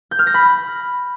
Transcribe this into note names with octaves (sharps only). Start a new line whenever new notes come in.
G6
F6
A#6
B5